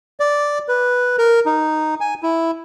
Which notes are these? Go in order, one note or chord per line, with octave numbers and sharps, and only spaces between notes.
D5
B4
A#4
D#4
G#5
E4